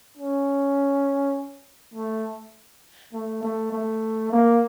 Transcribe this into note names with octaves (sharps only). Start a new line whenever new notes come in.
C#4
A3
A3
A3
A3
A#3